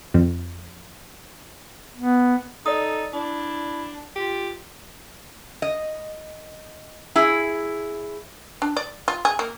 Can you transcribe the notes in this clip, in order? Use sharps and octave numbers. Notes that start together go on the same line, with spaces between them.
F2
B3
D#4 A4 D5 D#6
D4 E4
F4 G4
D#5
E4 G#4
D4
D5
F4
G#4
A#3